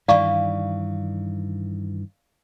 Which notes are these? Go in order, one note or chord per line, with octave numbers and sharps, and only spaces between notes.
G2 D#3 E3 D5 F5 C#6